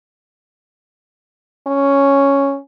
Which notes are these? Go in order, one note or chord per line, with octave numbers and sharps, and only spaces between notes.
C#4